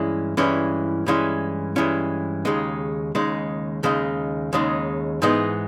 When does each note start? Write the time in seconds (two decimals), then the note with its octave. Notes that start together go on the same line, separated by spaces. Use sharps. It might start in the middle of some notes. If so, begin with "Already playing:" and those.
Already playing: G2 E3 G#3 C#4 E4
0.37 G2 E3 G#3 C#4 E4
1.06 G2 E3 G#3 C#4 E4
1.76 G2 E3 G#3 C#4 E4
2.45 D#2 C#3 G#3 D#4
3.15 D#2 C#3 G#3 D#4
3.83 D#2 C#3 G#3 D#4
4.53 D#2 C#3 G#3 D#4
5.22 G#2 E3 G#3 B3 D#4